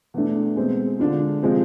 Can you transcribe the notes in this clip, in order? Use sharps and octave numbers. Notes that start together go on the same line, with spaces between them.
E2 B2 A3 D4
B2 G#3 C4
D3 G#3 D4 F4
C3 F3 G#3 C4